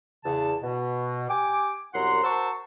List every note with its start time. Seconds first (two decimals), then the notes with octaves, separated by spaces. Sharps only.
0.25 E2 C#3 A5
0.63 B2
1.30 G4 G5 G#5 D6
1.94 C2 F#2 F#5 A#5 C6
2.24 F#4 A#4 C5 A5 C#6 E6